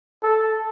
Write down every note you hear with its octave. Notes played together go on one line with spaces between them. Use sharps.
A4